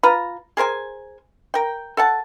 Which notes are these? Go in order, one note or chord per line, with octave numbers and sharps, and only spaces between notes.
F4 B4 A#5
G#4 A#4 C5 G#5
A#4 G5
A4 F#5 A5